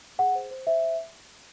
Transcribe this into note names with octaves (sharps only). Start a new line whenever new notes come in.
G#4 F#5
C5
C5
C5 E5